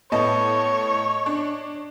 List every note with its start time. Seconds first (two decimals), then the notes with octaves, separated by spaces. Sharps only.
0.12 A2 B3 C#5 D#5 A5
1.26 D4